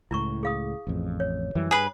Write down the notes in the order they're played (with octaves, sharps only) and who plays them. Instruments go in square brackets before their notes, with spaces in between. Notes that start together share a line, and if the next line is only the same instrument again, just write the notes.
[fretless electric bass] C#2 A2 [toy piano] E4 A#5 C#6
[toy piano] G#4 F5 D#6
[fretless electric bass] A1 F2
[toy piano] C#5
[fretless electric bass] F#2 E3 G3
[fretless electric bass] G2 [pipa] G#4 B4